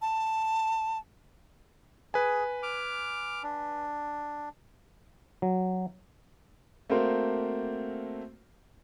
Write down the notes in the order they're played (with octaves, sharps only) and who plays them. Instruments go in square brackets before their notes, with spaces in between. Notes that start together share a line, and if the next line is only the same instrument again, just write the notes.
[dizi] A5
[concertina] G#4 [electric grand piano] B4 G#5
[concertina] D6 F6
D4
[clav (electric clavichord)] F#3
[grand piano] A3 A#3 C4 F#4 A#4 C5